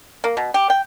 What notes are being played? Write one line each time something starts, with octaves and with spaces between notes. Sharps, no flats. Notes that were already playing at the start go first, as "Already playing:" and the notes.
A#3
B2
G4
G5